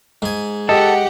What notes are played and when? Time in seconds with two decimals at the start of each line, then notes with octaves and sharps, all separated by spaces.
0.22 G#2 G#5
0.69 G4 A4 D#5 F#5